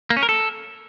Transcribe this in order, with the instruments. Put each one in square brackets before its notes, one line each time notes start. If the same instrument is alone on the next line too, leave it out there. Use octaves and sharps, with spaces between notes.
[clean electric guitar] A#3
C#4
A#4
A4